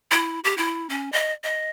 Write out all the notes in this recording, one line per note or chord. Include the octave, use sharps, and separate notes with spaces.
E4
G4
E4
C#4
D#5
D#5